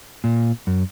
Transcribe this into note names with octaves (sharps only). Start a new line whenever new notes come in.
A#2
F#2